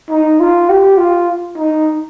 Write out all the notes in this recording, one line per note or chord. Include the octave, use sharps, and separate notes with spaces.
D#4
F4
G4
F4
D#4